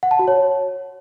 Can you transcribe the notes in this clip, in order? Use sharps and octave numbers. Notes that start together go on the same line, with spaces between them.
F#5
A5
F#4
C#5